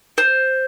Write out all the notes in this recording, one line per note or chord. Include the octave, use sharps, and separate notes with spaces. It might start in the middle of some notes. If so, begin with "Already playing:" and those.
C5